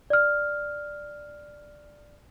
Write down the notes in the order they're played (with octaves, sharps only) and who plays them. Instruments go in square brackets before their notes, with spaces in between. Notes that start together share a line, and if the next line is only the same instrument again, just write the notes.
[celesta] D5 F6